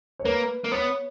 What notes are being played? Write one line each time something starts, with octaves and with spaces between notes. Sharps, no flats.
C#5
A#3 B4
A#3
B3 C#5